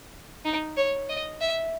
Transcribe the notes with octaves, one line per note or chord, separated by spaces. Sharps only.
D#4
C#5
D#5
E5